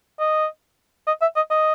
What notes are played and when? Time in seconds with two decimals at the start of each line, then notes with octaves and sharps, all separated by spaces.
0.19 D#5
1.07 D#5
1.22 E5
1.36 D#5
1.51 D#5